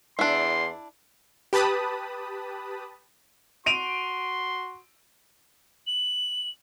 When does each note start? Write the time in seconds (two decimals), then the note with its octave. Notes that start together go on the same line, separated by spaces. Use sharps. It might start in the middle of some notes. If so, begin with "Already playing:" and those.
0.19 E2 D4 E4 C6
1.53 G4 B4 A5 B5 D#6
3.66 F#4 C6 D7 D#7 F7
5.87 F#7